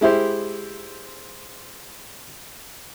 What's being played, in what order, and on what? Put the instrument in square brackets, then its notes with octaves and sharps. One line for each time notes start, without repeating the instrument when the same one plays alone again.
[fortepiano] G#3 E4 G4 C5